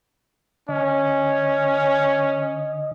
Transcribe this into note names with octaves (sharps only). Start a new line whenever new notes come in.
D3 C#4 D#5